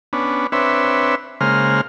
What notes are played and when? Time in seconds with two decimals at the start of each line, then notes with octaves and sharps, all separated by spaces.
0.13 B3 C#4 D4
0.52 C4 D4 B4 C#5 E5
1.41 C#3 G#3 A#3 C5 F6